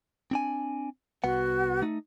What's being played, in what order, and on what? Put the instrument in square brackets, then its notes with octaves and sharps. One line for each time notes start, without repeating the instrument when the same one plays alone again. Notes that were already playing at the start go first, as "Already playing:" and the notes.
[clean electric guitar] C4 D4 G#5
[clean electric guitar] C2 B3 F#5 [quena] F#4
[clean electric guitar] A3 D#4